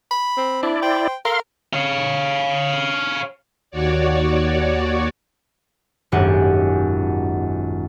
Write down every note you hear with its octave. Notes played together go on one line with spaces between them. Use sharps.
B5
C4
D4 E4 D5
C5 G5
A4 A#4 F5 C6
C#5 F5
D#2 F#4 C#5 D5
D#1 G#1 F#2 G4 F#5 G#5